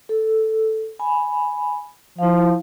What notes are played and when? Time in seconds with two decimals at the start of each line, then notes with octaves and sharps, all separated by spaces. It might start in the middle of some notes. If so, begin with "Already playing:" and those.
0.09 A4
0.99 G#5 B5
2.19 F3 E4 F5